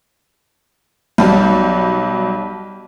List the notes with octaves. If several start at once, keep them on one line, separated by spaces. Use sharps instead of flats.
B1 G3